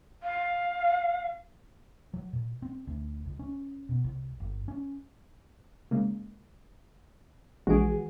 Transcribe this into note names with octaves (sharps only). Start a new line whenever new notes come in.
F5
F#3
A#2
C4
D2
C#2
C#4
B2
C2
G1
C#4
C#3 G#3 A#3
A#1 E3 G#3 F#4 G#4 D7